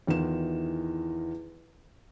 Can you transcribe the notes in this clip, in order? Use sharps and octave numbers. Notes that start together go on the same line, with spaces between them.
E2 D#3 E3 F4 E7